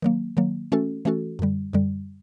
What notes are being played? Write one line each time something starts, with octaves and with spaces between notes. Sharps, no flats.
D#3 F#3 A#3
D#3 F#3 A#3
E3 A3 C#4 F#4 A4
E3 A3 C#4 F#4 A4
F#2 D3 G3
F#2 D3 G3